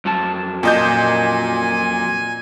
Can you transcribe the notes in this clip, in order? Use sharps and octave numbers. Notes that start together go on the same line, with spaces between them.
F2 F#3 A5
A#2 D#5 G#5 G6